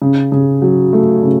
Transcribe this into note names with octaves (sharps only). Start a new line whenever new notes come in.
C#3
C#3
F#3
A3
C#3